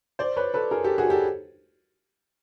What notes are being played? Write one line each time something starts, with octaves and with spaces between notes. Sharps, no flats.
C5 D5
B4 C#5
A4 B4
G#4 A#4
G4 A4
F#4 G#4
G4 A4